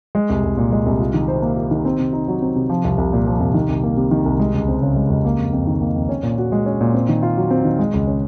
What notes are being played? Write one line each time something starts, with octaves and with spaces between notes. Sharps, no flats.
G#3
C2
C2
A#2
G#3
C2
F4
D#3
C5
A#3
F4
D#3
C4
C3
D#4
F#3
C4
C3
F3
C2
C2
A#2
F3
C2
D#3
C2
A#3
C3
D#3
C2
G#3
C#2
C4
C#3
G#3
C#2
A#3
F2
F2
D#3
A#3
F2
C#4
A#2
F#4
G#3
C#4
A#2
C4
D#3
F4
F#3
C4
D#3
G#3
C#2
C#4